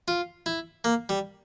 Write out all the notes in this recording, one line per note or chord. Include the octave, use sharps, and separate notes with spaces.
F4
E4
A#3
G3